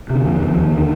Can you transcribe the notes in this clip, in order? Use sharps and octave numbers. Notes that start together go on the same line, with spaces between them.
C3
D3
F2
F2 D#3
D#2
D3